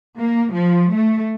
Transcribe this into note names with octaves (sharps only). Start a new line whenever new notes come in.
A#3
F3
A3